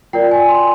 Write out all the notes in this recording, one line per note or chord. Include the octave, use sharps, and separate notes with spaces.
F4 A#4 D5 G5
G#5
C6